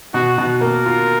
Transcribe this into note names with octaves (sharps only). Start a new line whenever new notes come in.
B2 F#4
B2
A#3 A#4
F4